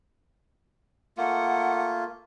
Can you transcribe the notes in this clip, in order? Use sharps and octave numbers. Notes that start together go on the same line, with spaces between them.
A3 A#3 F4 F#5